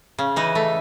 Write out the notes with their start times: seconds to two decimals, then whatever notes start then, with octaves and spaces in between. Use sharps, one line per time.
0.19 C#3
0.36 E3 D#4
0.55 A3